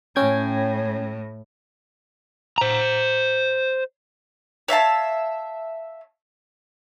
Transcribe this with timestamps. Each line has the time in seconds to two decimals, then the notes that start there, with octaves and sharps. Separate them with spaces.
0.16 A2 C#4 G5 G#6
2.58 C5 A#5
4.68 C#5 E5 F5 A5